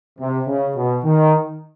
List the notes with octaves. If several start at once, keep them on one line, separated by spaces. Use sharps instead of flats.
C3
C#3
B2
D#3